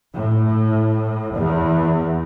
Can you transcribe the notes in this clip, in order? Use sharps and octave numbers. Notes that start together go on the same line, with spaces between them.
A2
E2